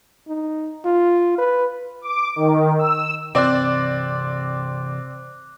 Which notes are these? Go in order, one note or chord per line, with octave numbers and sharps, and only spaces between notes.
D#4
F4
B4
D6
D#3
E6
C3 E3 C4 D5 D6 F#6